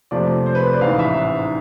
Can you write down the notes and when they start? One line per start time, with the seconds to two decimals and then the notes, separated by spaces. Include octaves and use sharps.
0.11 F2 C3 F3 A3 D5
0.46 C5
0.55 B4
0.64 C5
0.73 D5
0.81 A1 G#2 E3 F5
0.99 E5